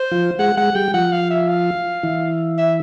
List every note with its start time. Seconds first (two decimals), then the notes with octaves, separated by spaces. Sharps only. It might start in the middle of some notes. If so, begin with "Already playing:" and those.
Already playing: C5
0.12 F3 F4
0.39 G#3 G#4 F#5
0.57 G#3 G#4 F#5
0.75 G3 G4 G5
0.94 F3 F4 F#5
1.12 F5
1.30 E5
1.48 F5
2.03 E3 E4
2.58 E5